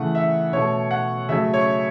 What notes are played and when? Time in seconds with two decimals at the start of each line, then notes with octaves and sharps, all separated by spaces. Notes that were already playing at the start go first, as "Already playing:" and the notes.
Already playing: C#3 E3 A3 F#5
0.15 E5
0.53 B2 A3 C#5
0.91 F#5
1.29 C#3 F#3 A3 E5
1.54 C#5